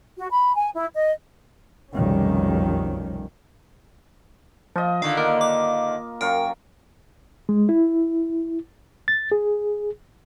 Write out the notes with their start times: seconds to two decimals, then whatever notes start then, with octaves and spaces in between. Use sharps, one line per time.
0.18 F#4
0.31 B5
0.56 G#5
0.74 E4
0.94 D#5
1.93 F1 B1 F2 D#3 G3 C#4
4.76 F3 F4 D#5
5.02 D3 D#3 F5
5.17 A#3 A#4
5.41 D6
6.21 F#2 F5 G5 C#6
7.49 G#3
7.69 E4
9.08 A6
9.32 G#4